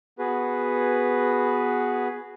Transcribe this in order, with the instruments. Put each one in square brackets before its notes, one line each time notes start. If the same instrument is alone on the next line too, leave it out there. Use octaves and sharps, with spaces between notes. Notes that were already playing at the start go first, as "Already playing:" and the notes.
[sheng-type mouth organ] B3 F#4 G#4 B4